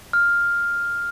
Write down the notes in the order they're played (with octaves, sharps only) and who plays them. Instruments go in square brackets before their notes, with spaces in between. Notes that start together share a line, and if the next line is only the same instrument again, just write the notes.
[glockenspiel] F6